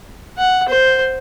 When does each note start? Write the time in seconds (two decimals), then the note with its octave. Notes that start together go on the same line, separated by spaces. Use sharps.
0.38 F#5
0.68 C5